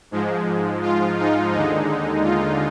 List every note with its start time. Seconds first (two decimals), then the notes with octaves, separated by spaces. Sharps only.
0.11 G#2 F3 G#3
0.82 F4
1.18 D#4
1.52 D#2 D3 G#3 D#4
2.24 F4